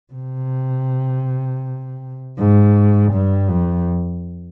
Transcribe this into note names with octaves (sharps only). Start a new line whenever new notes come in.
C3
G#2
G2
F2